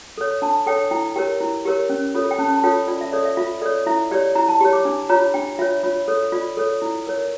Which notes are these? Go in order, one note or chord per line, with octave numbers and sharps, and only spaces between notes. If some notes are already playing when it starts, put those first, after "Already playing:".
A4 C#5
D4 A5
A4 C#5 G5
E4 G5
G4 A#4 C#5 G5
E4
G4 A#4 C#5
C#4
F4 A4 C#5
G5
C#4 A5
A5
F4 A4 C#5 G5
F4 D5
E5
A4 C#5 D5
E5
F4 E5
A4 C#5 D5
E4 E5
G4 C#5 D5
E4 A#5
A5
G4 C#5
D6
D4
F4 C#5 A#5
D4 G5
F4 C#5 E5
F4 C#5
A4 C#5
F4 D5
A4 C#5
E4
A#4 C#5